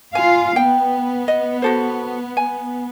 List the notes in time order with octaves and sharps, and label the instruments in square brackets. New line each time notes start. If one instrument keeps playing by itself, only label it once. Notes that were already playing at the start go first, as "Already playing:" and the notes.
[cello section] F4 F5 [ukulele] G#5
[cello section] B3 [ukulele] G5
[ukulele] D#5
F#4 A4 C5
G#5